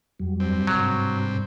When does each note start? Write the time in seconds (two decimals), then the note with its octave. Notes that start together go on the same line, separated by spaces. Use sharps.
0.20 F2 F#3 G3
0.40 G2 C4
0.67 G#2 C3 F#3